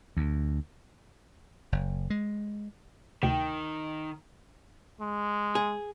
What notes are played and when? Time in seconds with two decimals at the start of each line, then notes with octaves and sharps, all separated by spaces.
0.17 D2
1.72 F#1
2.10 G#3
3.23 D2 C3 D#3 G5
5.00 G#3
5.55 G#4